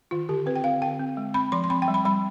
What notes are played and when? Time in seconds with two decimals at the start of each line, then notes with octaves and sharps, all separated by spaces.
0.11 D#3 F4
0.29 D3 G4
0.46 C4 B4
0.56 G5
0.64 C4 F5
0.82 D3 G5
1.00 C4
1.17 G#3
1.34 C4 B5
1.52 F3 C6
1.64 C6
1.70 C4 B5
1.82 G5
1.88 G3
1.94 B5
2.05 G3 B5